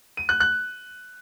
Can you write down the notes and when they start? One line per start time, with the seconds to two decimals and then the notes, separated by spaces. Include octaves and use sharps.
0.17 D#7
0.29 F#6
0.40 F#6